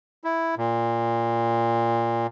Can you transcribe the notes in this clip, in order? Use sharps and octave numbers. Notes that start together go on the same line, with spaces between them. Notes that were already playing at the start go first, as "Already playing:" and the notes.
E4
A#2